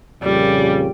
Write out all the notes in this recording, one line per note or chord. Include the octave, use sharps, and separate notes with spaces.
F2 A#2 C#3 G3